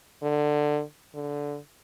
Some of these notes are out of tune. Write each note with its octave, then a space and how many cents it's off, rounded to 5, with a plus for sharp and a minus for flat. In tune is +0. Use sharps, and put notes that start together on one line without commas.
D3 +15
D3 -15